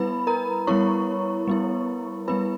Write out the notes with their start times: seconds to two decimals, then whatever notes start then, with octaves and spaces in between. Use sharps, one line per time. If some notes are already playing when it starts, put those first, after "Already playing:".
Already playing: G3 B3 E4 B4 B5
0.27 A#4 A#5
0.67 G3 B3 E4 C#5 C#6
1.48 G3 B3 E4
2.28 G3 B3 E4 B4 B5